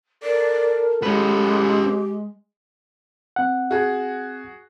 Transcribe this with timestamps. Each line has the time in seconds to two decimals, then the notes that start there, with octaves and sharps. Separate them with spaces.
0.23 A4 A#4 D5
1.03 G#3 C#4 G4 B4
3.36 C4 F#5
3.71 F#4 G#4